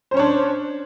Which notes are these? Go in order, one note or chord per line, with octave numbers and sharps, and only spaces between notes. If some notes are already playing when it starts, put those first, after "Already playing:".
C#4 D4 C5 C#5